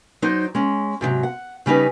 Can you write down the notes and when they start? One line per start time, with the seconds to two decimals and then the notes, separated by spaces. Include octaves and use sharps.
0.22 F#3 D#4 C5 D5
0.55 G#3 C#4
1.01 G#2 C3 F3 F#3
1.23 F#5
1.66 C#3 G3 C#4 D#4 B4